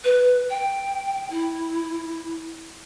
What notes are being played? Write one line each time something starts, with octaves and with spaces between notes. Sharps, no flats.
B4
G5
E4